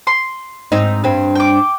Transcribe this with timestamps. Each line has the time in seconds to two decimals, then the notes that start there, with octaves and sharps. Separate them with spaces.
0.07 C6
0.72 G#2 C4 D#4
1.04 G2 C4
1.35 G5 D6